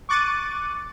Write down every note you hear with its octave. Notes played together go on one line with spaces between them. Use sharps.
C#6 D6 F#6 A6 C#7 D#7